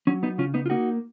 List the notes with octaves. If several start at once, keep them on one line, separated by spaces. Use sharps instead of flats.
F#3 C#4
B3 D#4
C#3 C#4 F4
B3 D#4
F4
A#3 D#4 F#4